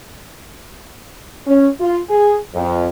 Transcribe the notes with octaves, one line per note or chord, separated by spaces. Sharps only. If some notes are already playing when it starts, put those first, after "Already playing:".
C#4
F4
G#4
F2